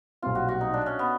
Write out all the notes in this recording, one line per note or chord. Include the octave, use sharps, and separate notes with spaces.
B1 A#2 G3 C4 F4
F#4
F#4
D#4
D4
C#4
B3